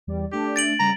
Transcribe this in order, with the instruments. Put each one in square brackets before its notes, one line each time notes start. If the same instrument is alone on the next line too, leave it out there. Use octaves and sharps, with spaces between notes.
[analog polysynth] E2 G3 D5
[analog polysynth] A3 D4 [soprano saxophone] G4
[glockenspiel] A6 D7 F#7
[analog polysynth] C#3 G3 [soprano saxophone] A#5